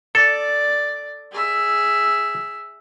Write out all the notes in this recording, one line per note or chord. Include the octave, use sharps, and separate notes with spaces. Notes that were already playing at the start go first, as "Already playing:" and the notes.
A4 D5
G#4 E5